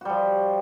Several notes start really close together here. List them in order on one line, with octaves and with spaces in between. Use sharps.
F#4 G3 F3